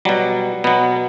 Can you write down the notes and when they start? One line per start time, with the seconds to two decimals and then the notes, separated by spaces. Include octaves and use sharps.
0.05 B2 F#3 G3
0.64 B2 F#3 B3